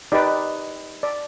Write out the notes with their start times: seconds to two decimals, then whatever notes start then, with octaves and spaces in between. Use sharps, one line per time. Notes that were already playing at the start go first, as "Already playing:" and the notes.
0.12 D#4 G4 B4 D5
1.03 D5